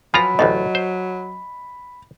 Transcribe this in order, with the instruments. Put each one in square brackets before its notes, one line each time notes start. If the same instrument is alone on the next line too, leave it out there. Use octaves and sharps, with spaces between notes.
[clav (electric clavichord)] F3 F4 A#5 [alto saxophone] F#3 [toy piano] B4 G#5 [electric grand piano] B5
[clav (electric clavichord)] A1 D2 A2 [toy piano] D#5
[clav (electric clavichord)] C5